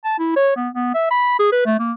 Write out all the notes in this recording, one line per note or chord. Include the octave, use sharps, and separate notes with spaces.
A5
E4
C#5
B3
B3
E5
B5
G#4
B4
A3
A#3